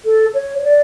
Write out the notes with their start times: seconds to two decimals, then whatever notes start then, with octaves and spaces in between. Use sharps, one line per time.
0.05 A4
0.34 C#5
0.59 C#5
0.64 D5